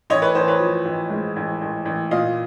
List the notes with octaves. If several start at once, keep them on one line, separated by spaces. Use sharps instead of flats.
A1 C#5 D#5
B4 C#5
A1 C5
B4 C#5
F3
A1
G#2
A1
A1
A1
A#2 D#5 F5